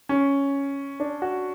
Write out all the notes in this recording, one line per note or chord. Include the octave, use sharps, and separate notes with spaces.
C#4
D4
F#4